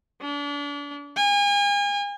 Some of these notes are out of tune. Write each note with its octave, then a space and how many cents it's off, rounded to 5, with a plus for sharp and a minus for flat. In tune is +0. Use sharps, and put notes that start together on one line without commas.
D4 -35
G#5 -40